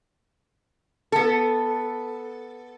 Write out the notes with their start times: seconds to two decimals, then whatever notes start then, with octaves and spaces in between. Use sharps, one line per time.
1.12 B3 A4